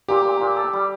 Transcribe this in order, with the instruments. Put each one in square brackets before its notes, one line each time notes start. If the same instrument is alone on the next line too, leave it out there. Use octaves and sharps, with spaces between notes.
[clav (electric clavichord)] A#2 [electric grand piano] G4
[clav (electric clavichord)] A#2
A#2
A4
G3